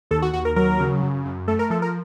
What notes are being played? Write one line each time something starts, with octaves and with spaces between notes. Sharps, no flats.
D#2 A4
F#4
D#2 F#4
A#4
F#3 A#4
C#3
F#2
F#2
A3 A4
A#4
F3 A4
A#4